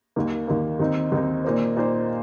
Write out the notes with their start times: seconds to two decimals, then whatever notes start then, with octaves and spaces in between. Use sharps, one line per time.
0.16 D#2 D#3 A#3
0.48 D#2 D#3 A#3
0.80 D#2 D#3 C4 D#4
1.12 D#2 D#3 C4 D#4
1.44 A#2 A#3 D#4 C5
1.77 A#2 A#3 D#4 C5